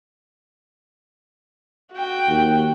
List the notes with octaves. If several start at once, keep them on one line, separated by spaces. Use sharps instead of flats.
F#4 G5
D#2